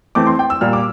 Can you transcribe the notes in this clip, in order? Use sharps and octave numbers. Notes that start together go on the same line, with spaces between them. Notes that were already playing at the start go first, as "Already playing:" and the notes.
E3 A3 C4 D6
C6
G5
E6
A#2 G3 A#3 F6
D6